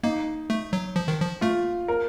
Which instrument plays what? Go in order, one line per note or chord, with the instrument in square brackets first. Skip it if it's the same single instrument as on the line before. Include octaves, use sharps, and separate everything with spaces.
[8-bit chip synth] A#3 [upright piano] D#4
[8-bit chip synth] A3
F#3
F3
D#3
F3
[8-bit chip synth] A3 [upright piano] F4
[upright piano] A#4